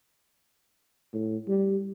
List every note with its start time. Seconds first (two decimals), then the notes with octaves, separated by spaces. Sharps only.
1.14 A2
1.47 G3